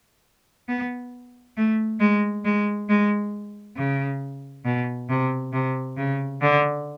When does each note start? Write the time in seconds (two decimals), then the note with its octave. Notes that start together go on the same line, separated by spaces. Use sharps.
0.68 B3
1.57 A3
2.00 G#3
2.45 G#3
2.89 G#3
3.77 C#3
4.65 B2
5.09 C3
5.53 C3
5.97 C#3
6.42 D3